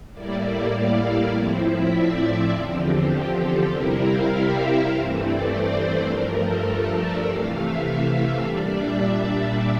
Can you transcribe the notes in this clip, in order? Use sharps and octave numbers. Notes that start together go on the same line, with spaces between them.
A2 G3 A#3 E4 D5
F5
A2 F3 C4 E4
E5
D5
E2 D3 F3 C4
G4
A4
C3 G3 C4 E4 A#4
F5
E5
G2 E3 A3 C4
D5
C5
G2 F3 A3 A#4
A4
A#4
D5
C3 E3 A3 F5
E5
A#2 G3 D4 D5
E5
D5